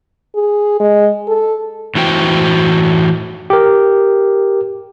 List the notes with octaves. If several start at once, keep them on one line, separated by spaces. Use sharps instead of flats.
G#4
G#3
A4
A2 E3 F#4 C5 G5
G4 A#4